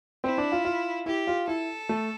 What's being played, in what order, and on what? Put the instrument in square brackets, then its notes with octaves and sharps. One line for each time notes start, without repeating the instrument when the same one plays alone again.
[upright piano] C4 [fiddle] E4
[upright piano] D4
F4
F4
[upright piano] E4 [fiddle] G4
[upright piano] F4
[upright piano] E4 [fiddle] A4
[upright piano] A3